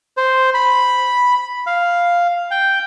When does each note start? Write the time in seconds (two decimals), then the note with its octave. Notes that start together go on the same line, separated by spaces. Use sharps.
0.17 C5
0.54 B5
1.67 F5
2.51 G5